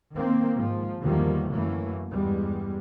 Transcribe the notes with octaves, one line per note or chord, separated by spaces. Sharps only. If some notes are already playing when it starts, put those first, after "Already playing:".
D#3 A#3 C4
G#2 F3
E2 D3 D#3 F3 G3 A#3
F#2 E3 F#3 A3 A#3
E2 G2 G3 G#3